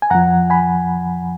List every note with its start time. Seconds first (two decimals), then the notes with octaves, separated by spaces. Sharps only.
0.02 G#5
0.10 F2 F3 F#5 A#5
0.50 G#5 B5